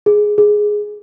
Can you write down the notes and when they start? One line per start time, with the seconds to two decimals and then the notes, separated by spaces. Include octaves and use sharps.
0.06 G#4
0.38 G#4